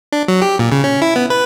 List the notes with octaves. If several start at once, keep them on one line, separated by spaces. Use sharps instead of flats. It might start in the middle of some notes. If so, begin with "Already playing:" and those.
D4
F#3
G4
A#2
C#3
C#4
E4
B3
B4